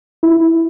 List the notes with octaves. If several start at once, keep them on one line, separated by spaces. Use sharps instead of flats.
E4